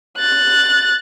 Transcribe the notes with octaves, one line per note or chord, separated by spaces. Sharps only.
F#6 A6